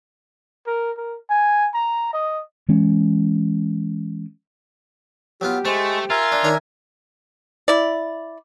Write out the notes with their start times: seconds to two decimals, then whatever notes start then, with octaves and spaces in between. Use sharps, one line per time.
0.67 A#4
0.98 A#4
1.30 G#5
1.74 A#5
2.13 D#5
2.69 E3 G#3 C#4
5.41 F#3 B3 F4 G4
5.65 G#3 A3 C5 C#6
6.10 F4 A#4 E5 G#5
6.32 D4
6.44 D#3 D4 C#5 A#5
7.68 E4 D5